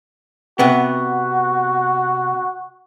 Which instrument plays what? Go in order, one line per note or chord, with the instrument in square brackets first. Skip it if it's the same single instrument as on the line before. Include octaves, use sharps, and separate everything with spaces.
[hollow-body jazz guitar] C3 B3 [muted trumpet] F#4